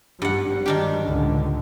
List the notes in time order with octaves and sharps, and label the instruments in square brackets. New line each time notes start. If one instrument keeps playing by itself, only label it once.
[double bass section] G#1 G3 [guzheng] G2 F#5
[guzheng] D#3 D4 G4
[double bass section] C#2 A2 D3